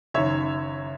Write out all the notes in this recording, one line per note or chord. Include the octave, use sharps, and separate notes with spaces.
F#1 F#2 D#3 C#5 E5